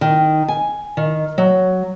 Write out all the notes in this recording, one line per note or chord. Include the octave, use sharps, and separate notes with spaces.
D#3
G#5
D#3
F#3